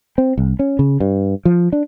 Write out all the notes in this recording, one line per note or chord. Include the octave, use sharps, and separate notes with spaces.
C4
C2
C#4
C#3
G2
F3
D4